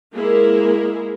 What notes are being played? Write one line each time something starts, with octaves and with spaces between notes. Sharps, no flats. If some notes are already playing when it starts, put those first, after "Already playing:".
G#3 A#3 E4 G#4 A#4